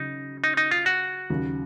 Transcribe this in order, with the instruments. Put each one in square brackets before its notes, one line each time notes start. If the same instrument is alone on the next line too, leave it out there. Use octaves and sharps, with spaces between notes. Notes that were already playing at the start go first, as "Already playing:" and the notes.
Already playing: [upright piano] C#3 F#3 [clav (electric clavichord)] D#4
[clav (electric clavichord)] D#4
D#4
F4
F#4
[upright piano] D#2 C#3 F#3 C#4